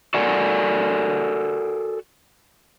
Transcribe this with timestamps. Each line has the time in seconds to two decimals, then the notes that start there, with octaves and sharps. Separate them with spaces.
0.14 F#4 A4 A#4 D5 F#5 G#5